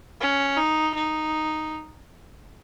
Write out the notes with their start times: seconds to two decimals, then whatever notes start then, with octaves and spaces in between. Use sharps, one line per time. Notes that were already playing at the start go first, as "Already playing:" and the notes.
0.21 C#4
0.57 D#4
0.94 D#4